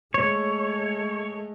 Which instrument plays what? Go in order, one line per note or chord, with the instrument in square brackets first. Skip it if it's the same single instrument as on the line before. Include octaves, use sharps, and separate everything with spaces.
[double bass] G#3 A3 [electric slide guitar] C#5